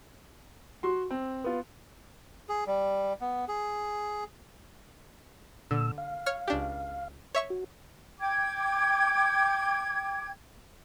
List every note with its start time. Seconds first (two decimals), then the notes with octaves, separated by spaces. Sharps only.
0.83 F#4 C6
1.11 C4
1.44 B3 F4
2.49 G#4
2.67 G3
3.21 B3
3.48 G#4
5.71 A#2 D3 E6
5.98 F5
6.26 C#5 F6
6.48 C#2 D4 G4
7.35 C#5 E5 C#6
7.50 F#4
8.19 G5 D6 G#6